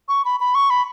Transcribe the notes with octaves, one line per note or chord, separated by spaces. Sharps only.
C#6
B5
B5
C#6
B5